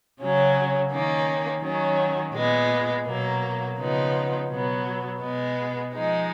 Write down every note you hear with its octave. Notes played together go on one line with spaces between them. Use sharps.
C#3 F#3 C#4
D#3 A#3 C#4
D#3 F#3 C#4
A#2 G#3 B3
B2 F#3 A#3
C#3 F3 B3 D#4
B2 F#3 B3
B2 G#3 B3
F3 G#3 D#4